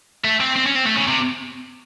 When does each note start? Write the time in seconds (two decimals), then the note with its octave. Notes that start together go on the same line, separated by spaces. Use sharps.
0.24 A3
0.40 C4
0.56 C4
0.66 C#4
0.75 C4
0.86 A3
0.96 C#3
1.07 C3